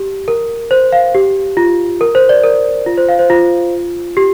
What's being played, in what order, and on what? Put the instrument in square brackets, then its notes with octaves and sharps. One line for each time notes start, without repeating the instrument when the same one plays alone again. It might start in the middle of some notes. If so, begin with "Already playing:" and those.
Already playing: [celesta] G4
A#4
C5
F5
G4
F4
A#4
C5
D5
A#4
F4
C5
F5
C5
F4
G4